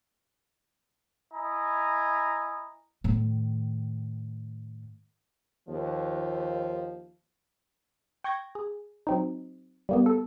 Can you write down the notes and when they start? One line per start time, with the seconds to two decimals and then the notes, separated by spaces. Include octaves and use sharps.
1.34 E4 D#5 G#5 A#5
3.04 A2 D#3
5.68 D#2 F3
8.24 G5 C#6 G6 G#6 A#6
8.55 G#4
9.07 F#3 C4 D#4
9.89 G3 A#3 B3
10.06 A4